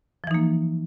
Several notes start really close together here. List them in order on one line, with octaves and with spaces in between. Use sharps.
F3 E3 D#4 A#3